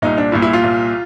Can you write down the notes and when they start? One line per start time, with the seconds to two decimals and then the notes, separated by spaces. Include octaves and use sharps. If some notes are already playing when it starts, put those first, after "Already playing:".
0.02 C2 A#2 D#4
0.18 D4
0.32 C2 A#2 E4
0.42 E4
0.53 F4
0.63 C2 A#2